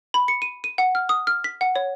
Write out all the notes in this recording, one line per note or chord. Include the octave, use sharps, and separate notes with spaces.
B5
C#7
D#7
D#7
F#5
F6
D#6
F6
B6
F#5
C#5